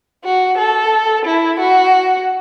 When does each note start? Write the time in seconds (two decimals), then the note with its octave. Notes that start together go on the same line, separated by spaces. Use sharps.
0.24 F#4
0.58 A4
1.25 E4
1.59 F#4